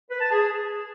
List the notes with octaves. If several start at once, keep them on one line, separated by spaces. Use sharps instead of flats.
B4
A5
G#4